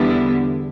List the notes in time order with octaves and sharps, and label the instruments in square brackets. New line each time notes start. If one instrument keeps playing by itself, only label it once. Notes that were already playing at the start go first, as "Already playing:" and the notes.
Already playing: [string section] E2 D3 G3 B3 E4